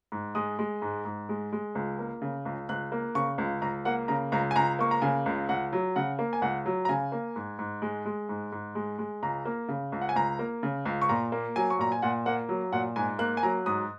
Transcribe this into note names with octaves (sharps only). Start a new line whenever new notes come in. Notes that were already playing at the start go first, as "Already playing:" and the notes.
G#2
G#3 D#6
G#3
G#2
G#2
G#3
G#3
C#2
A#3
C#3
C#2
C#2 F#6
A#3
C#3 C#6
C#2
C#2 A#5
A#3 F#5
C#3 A#5
C#2 A#5
G#5
C#2 A#5
A#3 C#6
A#5
C#3 G#5
C#2
C#2 F#5
F#3
C#3 F#5
A#3
G#5
C#2 F#5
F#3
A#5
C#3 G#5
A#3
G#2
G#2
G#3
G#3
G#2
G#2
G#3
G#3
C#2 A#5
A#3
C#3
C#2
F#5
G#5
C#2 A#5
A#3
C#3
C#2
C#6
A#2 A#5
A#3
F#3 G#5
C#6
A#2 A#5
G#5
A#2 F#5
A#3 F#5
F#3
A#2 F#5
G#2 G#5
A#3 F#6
G#5
F#3 A#5
G#2 D#6